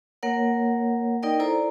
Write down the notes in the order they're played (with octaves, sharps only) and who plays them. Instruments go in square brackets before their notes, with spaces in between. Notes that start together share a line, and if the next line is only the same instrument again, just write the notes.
[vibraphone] A#3 A#4 C#5 F#5
D#4 A#4 D5 D#5 G5
E4 A4 C5 D5 A#5